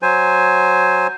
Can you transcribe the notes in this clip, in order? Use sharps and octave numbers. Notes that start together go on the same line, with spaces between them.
F#3 C5 G#5